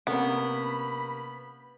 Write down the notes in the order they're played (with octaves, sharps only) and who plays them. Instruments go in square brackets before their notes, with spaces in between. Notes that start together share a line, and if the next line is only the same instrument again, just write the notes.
[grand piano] C3 A#3 C#4 [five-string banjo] B3 [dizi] B5